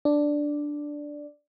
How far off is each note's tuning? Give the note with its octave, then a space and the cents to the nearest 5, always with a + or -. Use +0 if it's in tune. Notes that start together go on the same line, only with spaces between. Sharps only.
D4 +0 D5 +0